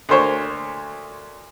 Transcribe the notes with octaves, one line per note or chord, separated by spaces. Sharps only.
D2 A#3 C5 C#5